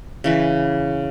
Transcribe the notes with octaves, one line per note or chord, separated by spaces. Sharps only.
C#3 E3 B4